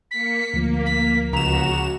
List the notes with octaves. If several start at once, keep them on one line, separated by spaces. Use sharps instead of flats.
A#3 B6 C#7
D2 F3 A#3
B6
C#2 F#4 A#5 E7